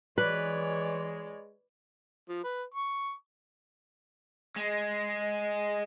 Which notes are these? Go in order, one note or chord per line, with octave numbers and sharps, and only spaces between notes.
E3 G#3 B4 C#5 D5
F3
B4
C#6
G#3